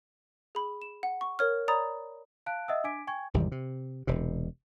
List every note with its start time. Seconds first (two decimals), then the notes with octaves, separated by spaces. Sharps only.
0.55 G#4 B5
0.82 E7
1.03 F#5
1.21 C#6
1.39 A#4 C#5 F6
1.68 C#5 D5 A#5 B5 D#6 A6
2.46 F5 A5 F#6 D7
2.68 D#5 E5 F#5 D#6 E6
2.84 D4 G#5 D6 G#6 B6 D7
3.07 G5 G#5 C#6 G#6
3.34 G#1 E2 C3 G3
3.52 C3
4.07 E1 C3